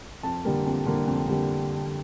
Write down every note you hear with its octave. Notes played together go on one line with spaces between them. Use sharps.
F2 A5
D3 G3 A#3
F2
D3 G3 A#3
F2
D3 G3 A#3